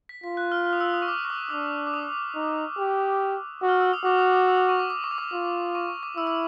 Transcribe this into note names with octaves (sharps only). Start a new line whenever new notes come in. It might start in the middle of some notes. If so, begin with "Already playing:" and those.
B6
F4 B6
F#6
F6
F6
D#6
E6
D#6
C#6
D6
C#6
D6
D4 D#6
D6
D#6
D#4
G4
F#4
F6
E6
D#6
F#4 D6
D#6
D#6
E6
D#6
C#6
D6
D6
C#6
D#6
D6
F4
C#6
C#6
D6
E4 E6
E6